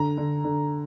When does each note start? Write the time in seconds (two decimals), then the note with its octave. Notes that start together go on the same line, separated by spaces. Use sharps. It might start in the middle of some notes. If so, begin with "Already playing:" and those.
Already playing: D3 A#5
0.17 D3
0.44 D3